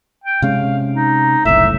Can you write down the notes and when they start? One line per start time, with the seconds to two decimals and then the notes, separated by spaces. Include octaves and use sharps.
0.24 G5
0.42 C3 G#3 C#4 F5
0.93 D#4
1.45 F#1 C2 A2 E5